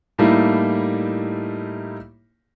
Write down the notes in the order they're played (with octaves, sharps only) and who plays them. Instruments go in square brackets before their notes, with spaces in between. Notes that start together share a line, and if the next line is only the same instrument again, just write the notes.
[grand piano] A2 G3 A3 A#3 D#4 E4